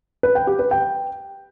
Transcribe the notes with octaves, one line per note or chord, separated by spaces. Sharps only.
B4
G5
G4
B4
G5